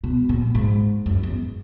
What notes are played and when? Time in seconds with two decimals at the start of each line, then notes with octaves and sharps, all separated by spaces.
0.04 B2
0.29 A#2
0.55 G#2
1.06 F#2
1.23 E2